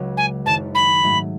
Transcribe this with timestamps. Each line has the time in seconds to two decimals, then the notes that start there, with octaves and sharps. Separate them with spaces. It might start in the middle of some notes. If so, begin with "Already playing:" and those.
Already playing: C#2 C#3 F#3 C#4 F#4
0.17 G#5
0.45 F#1 F#2 D#3 A5
0.75 B5
1.03 G#2 F#3 A3